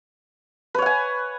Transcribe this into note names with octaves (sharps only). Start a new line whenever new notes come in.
B4 C#5 F#5 G#5